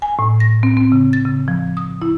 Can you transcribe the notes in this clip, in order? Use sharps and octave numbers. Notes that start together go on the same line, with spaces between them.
G#5
A2
A#6
C4
C4
C#3
A6
C#3
F3
D#6
E4